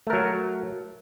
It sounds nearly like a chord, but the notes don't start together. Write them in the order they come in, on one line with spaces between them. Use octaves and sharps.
A3 A#4 F#3